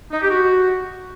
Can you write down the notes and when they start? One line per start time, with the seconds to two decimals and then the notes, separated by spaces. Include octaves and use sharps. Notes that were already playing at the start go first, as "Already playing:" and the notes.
0.12 D#4
0.21 G4
0.30 F#4